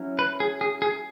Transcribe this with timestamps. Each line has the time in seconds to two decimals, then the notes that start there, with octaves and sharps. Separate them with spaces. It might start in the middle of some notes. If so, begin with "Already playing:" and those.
Already playing: F#3 C#4 E4
0.19 B4
0.40 G#4
0.61 G#4
0.82 G#4